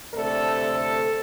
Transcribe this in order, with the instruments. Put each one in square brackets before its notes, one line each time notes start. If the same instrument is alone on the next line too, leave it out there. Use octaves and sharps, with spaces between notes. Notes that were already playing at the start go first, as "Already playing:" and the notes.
[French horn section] D2 C3 A3 A4 D5